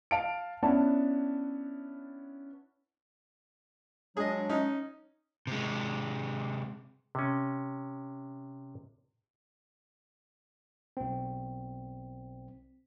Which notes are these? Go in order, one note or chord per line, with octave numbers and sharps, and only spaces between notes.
F5 A5 D7
B3 C#4 D4 E4 F#5 A5
F#3 G#3 D4 G#4 D#5
C#4 D#4
C3 G#3
C3 C#4
B1 C4